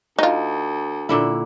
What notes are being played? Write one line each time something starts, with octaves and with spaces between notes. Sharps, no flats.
D2 D#4 F4
A#2 D3 E4